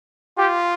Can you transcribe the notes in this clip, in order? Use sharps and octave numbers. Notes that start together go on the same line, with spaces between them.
F4 G4